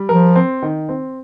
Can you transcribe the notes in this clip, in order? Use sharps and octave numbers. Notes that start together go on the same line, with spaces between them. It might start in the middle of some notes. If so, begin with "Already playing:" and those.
Already playing: G3
F3 A#4
C4
D#3
C4